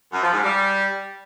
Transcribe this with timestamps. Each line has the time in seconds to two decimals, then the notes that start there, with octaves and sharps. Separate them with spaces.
0.13 F#2
0.23 F3
0.33 G#2
0.43 G3